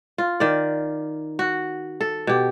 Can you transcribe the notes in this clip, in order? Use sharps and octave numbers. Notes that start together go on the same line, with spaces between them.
F4
D#3 D5
F#4
A4
B2 G4